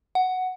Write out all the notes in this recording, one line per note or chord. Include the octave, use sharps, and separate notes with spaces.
F#5